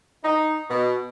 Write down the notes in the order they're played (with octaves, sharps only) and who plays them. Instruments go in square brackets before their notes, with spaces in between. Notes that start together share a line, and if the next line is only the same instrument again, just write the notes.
[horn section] D#4
B2